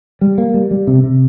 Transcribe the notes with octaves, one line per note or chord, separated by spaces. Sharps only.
G3
A#3
G3
G3
C3
C3